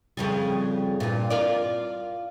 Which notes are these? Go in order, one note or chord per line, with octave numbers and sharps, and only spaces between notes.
F2 C#3 G3
G2 A#2
F4 A#4 D5